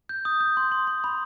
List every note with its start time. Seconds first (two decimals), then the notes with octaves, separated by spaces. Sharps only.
0.09 G6
0.25 D#6
0.40 G6
0.57 C6
0.72 C6
0.87 C6
1.04 B5